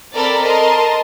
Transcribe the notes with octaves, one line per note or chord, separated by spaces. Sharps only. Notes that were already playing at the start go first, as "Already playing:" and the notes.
C4 A4 A#4 D5 B5 A6
A#4 D#5 A5 C6